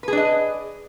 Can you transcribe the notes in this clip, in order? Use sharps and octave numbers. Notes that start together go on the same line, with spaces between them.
D4 G#4 B4 D#5